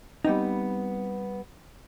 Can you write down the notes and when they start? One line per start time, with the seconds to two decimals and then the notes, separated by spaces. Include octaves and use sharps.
0.25 G3 B3 C4 D#4